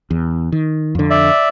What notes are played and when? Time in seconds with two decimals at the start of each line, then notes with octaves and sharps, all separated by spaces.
0.11 E2
0.52 D#3
0.95 F2 D3
1.10 D5 E5